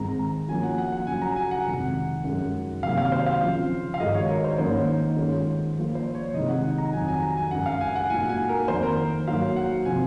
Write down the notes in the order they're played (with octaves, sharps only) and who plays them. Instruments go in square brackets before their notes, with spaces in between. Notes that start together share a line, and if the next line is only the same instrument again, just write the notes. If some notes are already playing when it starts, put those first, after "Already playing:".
Already playing: [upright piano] G#2 D#3 G#3 C4 [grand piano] A#5
[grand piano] A#5
[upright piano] F3 A#3 C#4 F#4 [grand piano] G#5
[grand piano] F#5
F#5
F#5
[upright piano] C#3 F#3 C#4 F#4 [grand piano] G#5
[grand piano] A#5
G#5
F#5
[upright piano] F2 C3 D#3 G#3
F#2 F3 G#3 D#4
[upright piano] C3 D#3 F#3 A#3 [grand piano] F5
[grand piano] F5
C5
F5
[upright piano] C#3 F3 C4 F4
[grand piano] F5
[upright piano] G#2 D#3 G#3 D#4 F#4 [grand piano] D#5
[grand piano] C#5
A#4
C5
[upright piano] G#2 D#3 A#3 C#4 [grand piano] C5
[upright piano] D#3 G#3 C#4 F4
F3 A#3 F4
[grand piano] C5
C#5
[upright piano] C3 D#3 G#3 D#4 [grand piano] D#5
[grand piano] F#5
F#5
A#5
[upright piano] F2 D#3 F#3 C4 D#4 [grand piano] G#5
[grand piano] G#5
A#5
G#5
[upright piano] F#2 C#3 G#3 [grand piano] F#5
[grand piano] F5
G#5
F#5
[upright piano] A#2 G#3 D#4 F#4 [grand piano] G#5
[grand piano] G#5
A#4
[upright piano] F2 D#3 A#3 [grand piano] C5
[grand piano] A#4
[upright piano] G#2 F#3 A#3 D#4 F#4 [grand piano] F5
[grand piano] F#5
[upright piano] C3 F3 C4 [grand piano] G#5